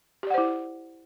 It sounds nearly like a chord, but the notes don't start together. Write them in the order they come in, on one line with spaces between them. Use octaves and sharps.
G4 D5 F#5 C5 E4